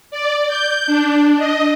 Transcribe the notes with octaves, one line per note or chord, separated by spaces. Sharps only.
D5
G6
D4
D#5